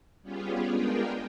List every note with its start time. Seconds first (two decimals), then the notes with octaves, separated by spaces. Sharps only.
0.22 G3 B3 C#4 F4 G4 G#4
0.68 G#3 B3 D4 F4 A#4 G5